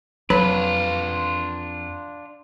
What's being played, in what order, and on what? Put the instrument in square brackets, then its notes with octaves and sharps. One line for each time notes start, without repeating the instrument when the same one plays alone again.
[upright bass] F2 [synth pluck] F#3 [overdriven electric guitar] D4 F4 [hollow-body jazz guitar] B4